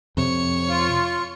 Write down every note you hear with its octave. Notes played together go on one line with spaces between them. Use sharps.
F2 C3 C#5 C#7
F4